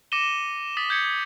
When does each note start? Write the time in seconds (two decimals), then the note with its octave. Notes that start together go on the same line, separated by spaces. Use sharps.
0.12 D6 A#6 C#7 D#7 E7 G7
0.77 D#6 A6 B6 E7 F#7
0.90 G6 G#6 C#7